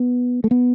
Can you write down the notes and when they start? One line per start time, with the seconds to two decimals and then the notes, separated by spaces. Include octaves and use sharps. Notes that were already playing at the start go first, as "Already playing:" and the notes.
Already playing: B3
0.44 A3
0.51 B3